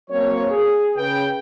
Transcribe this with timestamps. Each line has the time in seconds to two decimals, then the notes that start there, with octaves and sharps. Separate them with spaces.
0.10 F#3 A#3 C4 C#5
0.51 G#4
0.97 C#3 B4 G5